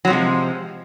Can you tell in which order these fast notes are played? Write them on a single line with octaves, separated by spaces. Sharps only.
F#3 F3 C3 G#3